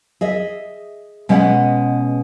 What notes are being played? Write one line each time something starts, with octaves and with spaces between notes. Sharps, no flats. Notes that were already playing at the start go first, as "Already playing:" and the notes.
G#4 D#5 E5
B2 G#3 C#4 B4 D#5 F#5